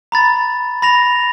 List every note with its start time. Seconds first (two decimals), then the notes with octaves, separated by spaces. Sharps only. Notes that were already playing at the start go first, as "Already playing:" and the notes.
0.12 A#5 B5 A6
0.82 B5 A#6 F7